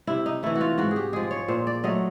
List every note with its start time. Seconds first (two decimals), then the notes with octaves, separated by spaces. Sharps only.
0.07 C3 E4
0.26 D#4
0.43 E3 A3 E4
0.55 F#4
0.61 F4
0.78 G#2 F#4
0.91 G#4
0.96 G4
1.13 F3 G#3 G#4
1.31 C#5
1.48 A#2 C5
1.67 D5
1.84 F#3 A3 D#5